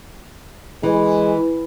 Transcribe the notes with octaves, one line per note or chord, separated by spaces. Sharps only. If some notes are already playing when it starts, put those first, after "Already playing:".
E3 G#3